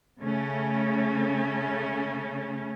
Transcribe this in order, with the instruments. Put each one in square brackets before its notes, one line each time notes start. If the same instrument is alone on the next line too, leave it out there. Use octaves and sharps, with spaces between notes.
[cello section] C#3 A3 C#4